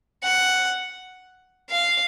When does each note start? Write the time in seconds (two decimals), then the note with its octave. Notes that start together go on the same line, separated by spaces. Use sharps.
0.23 F#5
1.70 F5